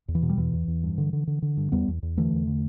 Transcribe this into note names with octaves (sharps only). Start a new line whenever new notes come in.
E2
E3
B2
G3
E2 E3
E2
E2
G2
D3
D3
D3
D3
G2
E2 G3 B3
E2
E2
D3 E3 A3
E2
D3